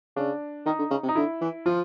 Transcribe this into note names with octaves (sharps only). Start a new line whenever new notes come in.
C#3 D4
D#3 D#4
D3
C#3
C3
D#4
D3 E4
E3
F3 F4